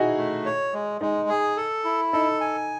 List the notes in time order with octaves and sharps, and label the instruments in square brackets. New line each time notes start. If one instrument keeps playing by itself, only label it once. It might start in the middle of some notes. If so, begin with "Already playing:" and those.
Already playing: [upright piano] D#4 E4 F#4 G#4
[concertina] A3
C#5
G#3
[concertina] G#3 [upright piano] D#4
[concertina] G#4
A4
E4
[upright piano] D#4 [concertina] A4
[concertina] G#5